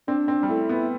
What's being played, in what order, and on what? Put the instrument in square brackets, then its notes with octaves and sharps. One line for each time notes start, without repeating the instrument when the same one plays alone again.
[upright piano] C4 [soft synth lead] D4
[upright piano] C4
G3
[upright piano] A3 [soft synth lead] E4
[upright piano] B3